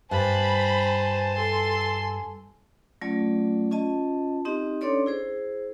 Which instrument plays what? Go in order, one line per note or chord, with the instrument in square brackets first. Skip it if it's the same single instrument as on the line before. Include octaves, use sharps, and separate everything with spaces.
[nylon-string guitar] G2 [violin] C5 [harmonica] G#5 A5 [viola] B5
[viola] A4 [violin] C6
[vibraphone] F#3 A3 C#4 F4 D5
C#4 F4 D#5 A5
C4 D#4 G4 D#5
C#4 D4 A4 C#5 D5 C6
E4 G#4 C5